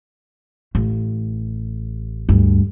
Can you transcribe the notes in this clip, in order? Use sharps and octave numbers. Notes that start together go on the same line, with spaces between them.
A1
D2 G2